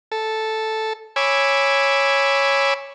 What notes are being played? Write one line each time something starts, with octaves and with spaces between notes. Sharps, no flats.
A4
C#5 G#5 B5 D6 E6